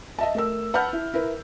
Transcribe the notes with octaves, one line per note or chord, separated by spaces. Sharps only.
D#5 E5 A5
A3 A#4 E6
B4 F#5 A5 B5 F6 G6
E4
E4 A#4 B4